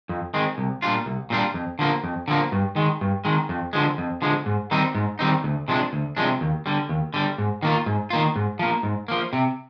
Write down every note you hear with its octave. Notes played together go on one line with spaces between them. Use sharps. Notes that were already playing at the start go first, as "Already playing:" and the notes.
F2
D#3 G#3 C4
C2
A#2 G3 D4 F4
C2
A#2 G3 D4 F4
F2
D3 F3 A#3
F2
D3 F3 A#3
G2
D#3 G#3
G2
D#3 G#3
F2
D3 F3 G#3
F2
D3 F3 G#3
G#2
D#3 G3 C4 D#4
G#2
D#3 G3 C4 D#4
D2
C3 F3 G#3 D4
D2
C3 F3 G#3 D4
D#2
D3 G3
D#2
D3 G3
G#2
D#3 A#3 F4
G#2
D#3 A#3 F4
G#2
F3 A#3
G#2
F3 A#3
C3